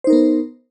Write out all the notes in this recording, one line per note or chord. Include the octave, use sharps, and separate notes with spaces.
B3 D#4 A#4 C5